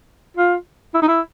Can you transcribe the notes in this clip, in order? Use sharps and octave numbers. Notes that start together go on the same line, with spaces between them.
F4
E4
D#4
E4